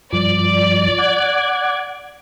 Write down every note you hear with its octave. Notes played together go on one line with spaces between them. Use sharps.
G2 F3 D5
F#5 D6 G#6